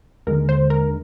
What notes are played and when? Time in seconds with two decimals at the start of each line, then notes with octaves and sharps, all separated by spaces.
0.27 D#2 D3 G#3 A#4
0.49 C5
0.70 A#4